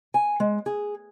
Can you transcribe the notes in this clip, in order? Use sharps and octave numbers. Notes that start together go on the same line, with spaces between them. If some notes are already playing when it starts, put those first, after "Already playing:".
G#5
G#3
G#4